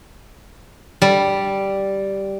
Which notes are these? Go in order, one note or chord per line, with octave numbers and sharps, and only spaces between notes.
G3